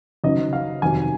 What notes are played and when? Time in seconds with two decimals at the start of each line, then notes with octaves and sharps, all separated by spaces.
0.24 F#1 F#2 D#3 D#5
0.53 F5
0.82 F1 D#2 D#3 F#3 G#5